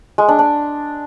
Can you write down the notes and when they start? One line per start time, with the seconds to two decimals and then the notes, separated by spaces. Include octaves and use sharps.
0.18 G#3
0.28 D4
0.39 D4